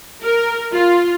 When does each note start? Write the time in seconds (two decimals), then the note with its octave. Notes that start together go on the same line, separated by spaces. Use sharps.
0.23 A#4
0.73 F4